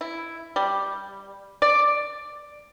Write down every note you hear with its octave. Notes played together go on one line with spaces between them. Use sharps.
E4
G3
D5